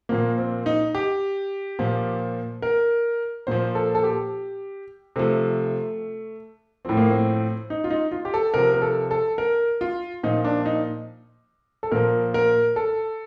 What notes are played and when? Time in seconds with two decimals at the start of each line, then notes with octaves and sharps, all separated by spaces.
0.09 A#2 F3 A#3
0.38 C4
0.66 D#4
0.95 G4
1.79 A#2 F3
2.62 A#4
3.47 A#2 F3 C5
3.75 A4
3.95 A4
4.04 G4
5.16 C3 F3 A3
6.85 A2 F3 C4
6.97 A#3
7.10 C4
7.70 D#4
7.84 F4
7.90 D#4
8.12 F4
8.25 G4
8.34 A4
8.54 C3 F3 A#4
8.73 A#4
8.82 A4
9.11 A4
9.38 A#4
9.81 F4
10.23 A#2 F3 D#4
10.44 D4
10.66 D#4
11.83 A4
11.91 A#2 F3 A#4
12.34 A#4
12.76 A4